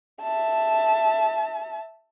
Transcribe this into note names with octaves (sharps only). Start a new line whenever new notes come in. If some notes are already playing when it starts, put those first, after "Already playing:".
E5 A5